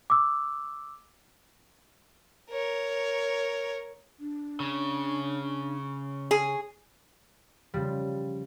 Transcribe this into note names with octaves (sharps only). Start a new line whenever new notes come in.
D6 E6
A#4 C#5
D4
C#3
G#4
C#3 F3 G3